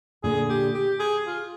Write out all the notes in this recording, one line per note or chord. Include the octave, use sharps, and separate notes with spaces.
A#2 D3 G#4
G4
G4
G#4
F4